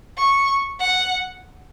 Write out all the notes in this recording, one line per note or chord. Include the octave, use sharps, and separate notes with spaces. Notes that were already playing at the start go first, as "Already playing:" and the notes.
C#6
F#5